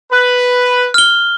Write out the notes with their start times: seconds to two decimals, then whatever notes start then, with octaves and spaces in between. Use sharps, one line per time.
0.13 B4
0.94 F6 G7